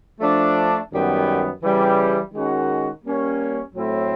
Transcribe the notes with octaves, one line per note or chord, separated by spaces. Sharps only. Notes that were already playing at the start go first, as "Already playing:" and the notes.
F3 A3 D4
F#2 D#3 G3 B3
C#3 E3 G3
D#3 G#3 C#4 F#4 A#4
G3 A#3 C#4
A2 F#3 A3 C4 E4